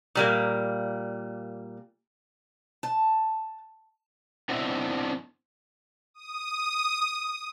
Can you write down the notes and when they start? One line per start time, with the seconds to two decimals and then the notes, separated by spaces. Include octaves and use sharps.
0.15 A#2 G3 A#3
2.83 A5
4.49 B3 C4 D4 E4 D#5 E5
6.14 D#6